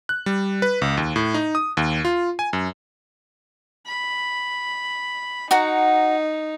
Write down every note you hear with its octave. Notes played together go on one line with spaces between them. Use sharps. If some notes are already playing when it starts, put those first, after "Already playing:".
F#6
G3
B4
C#2
D#2
A2
D#4
D#6
D#2
F4
G#5
F#2
B5
D#4 F#4 F#5 A#5